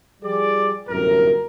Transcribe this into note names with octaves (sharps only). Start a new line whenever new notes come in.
F3 G3 G#4 D5
G1 F#2 A2 C3 A#4